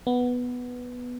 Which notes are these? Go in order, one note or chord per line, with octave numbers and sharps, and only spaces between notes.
B3